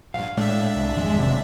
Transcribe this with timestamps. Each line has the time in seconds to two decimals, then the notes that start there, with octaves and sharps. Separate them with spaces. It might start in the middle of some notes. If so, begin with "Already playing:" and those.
0.14 A#1 G2 F5
0.37 A2 G#3 D4 E5
0.76 C2
0.97 G#1 F2 G3 G#3
1.19 F#1 C3